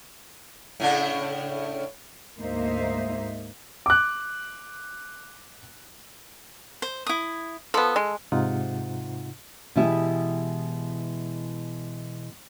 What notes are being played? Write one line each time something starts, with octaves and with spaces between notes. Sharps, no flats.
A2 C#3 D4
D2 G#2 A#3 D#4 C5 E5
D6 F#6
C5
E4 D#6
F3 B3 A4
G#3
G#2 C3 D#4 F4 F#5
B2 E3 G#3 B3 E4 G4